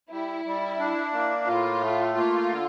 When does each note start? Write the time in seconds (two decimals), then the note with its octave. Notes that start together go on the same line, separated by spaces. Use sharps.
0.11 G3 E4
0.45 G3
0.79 D4
1.13 A#3
1.47 A2 F4
1.81 A3
2.15 A#3 F4
2.49 D3